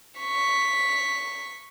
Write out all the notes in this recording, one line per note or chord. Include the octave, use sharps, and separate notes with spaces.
C#6 B6